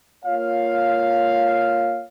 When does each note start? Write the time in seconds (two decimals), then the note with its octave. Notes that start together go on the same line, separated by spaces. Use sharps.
0.24 A#3 F4 C#5 F5